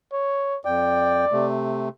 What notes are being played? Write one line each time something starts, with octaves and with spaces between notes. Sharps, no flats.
C#5
F2 D5 G5
C3 A3